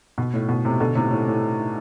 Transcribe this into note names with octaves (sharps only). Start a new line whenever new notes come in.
B2
A2
B2
A2 C3
B2 D3
A2 C3
A2
A2